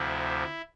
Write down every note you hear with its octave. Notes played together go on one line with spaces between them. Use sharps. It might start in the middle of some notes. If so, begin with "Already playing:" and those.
Already playing: D2 C3 F3 E4